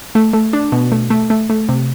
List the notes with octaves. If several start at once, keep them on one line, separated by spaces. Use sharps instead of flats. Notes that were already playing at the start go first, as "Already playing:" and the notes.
A3
A3
D4
B2
A3
A3
A3
A3
C3